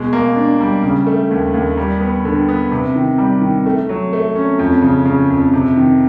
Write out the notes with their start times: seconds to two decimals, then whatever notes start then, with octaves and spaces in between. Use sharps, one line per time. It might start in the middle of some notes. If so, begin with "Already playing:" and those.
Already playing: B2 G#3
0.13 A#3
0.36 D4
0.61 G3
0.84 C#3
1.07 A3
1.31 D#2
1.54 D#2
1.77 G3
2.01 B3
2.25 D3
2.49 B3
2.72 C3
2.96 D#3
3.18 G3
3.41 D#3
3.66 A3
3.89 F#3
4.13 A3
4.35 C#4
4.59 F2
4.82 C#3
5.06 C#3
5.30 F2
5.54 C3
5.77 D#3